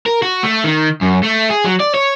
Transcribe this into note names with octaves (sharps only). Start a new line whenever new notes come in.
A#4
F#4
A3
D#3
F#2
A3
G#4
F#3
D5
C#5